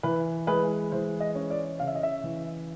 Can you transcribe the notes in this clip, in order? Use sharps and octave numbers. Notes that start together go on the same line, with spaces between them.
E3 B4
G#3 B4
E3 C5
D#5
C#4
D5
C#3 F5
E5
D#5
E5
E3